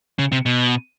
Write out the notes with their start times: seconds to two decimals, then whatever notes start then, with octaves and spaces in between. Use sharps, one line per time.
0.19 C#3
0.32 C3
0.46 B2